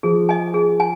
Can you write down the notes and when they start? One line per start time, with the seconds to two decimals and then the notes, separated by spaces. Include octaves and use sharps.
0.03 F3 G#4
0.29 D#5 G#5
0.54 G#4
0.80 G#5